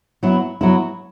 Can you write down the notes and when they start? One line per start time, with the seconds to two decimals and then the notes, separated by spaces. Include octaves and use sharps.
0.23 F#3 B3 E4
0.61 F#3 B3 E4